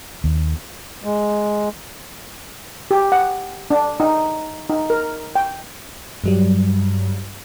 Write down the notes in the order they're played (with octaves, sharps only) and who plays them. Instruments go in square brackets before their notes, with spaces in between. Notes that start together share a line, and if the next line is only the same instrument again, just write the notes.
[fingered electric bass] D#2
[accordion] G#3
[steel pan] G4
F#5
D4
D#4
D#4
A#4
G5
[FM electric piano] G2 F#3 G3